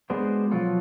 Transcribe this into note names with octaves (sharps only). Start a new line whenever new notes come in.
G#3 B3 D4 F#4 C5
B2 F3 F#3 F4 A4